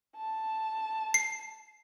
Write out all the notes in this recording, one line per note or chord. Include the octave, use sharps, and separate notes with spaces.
A5
C7